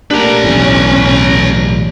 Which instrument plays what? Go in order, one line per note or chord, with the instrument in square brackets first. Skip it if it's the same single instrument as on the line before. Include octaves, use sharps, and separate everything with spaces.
[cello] A3 A#3 [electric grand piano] D4 G4 [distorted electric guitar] B4 A#5
[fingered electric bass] B1 E2 A2 [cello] C#4